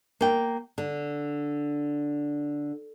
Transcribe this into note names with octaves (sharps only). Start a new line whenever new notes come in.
A#3 G5
D3